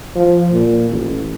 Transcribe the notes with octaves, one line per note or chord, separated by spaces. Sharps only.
F3
A#2
A1